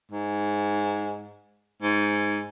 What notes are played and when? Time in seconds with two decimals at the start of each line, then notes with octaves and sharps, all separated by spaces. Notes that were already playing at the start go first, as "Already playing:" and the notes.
0.12 G#2
1.82 G#2